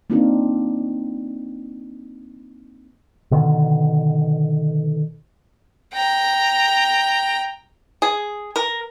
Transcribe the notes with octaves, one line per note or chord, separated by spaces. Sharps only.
A#3 C4 D4 D#4 F4 A#4
B2 D3 D#3
G5 A#5
G#4
A#4